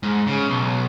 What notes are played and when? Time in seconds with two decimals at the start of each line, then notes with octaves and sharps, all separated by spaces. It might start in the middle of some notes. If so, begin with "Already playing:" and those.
0.03 G#2
0.27 C#3
0.48 B1